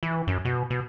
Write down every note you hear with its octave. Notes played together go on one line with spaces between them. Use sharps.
E3
F#2
B2
B2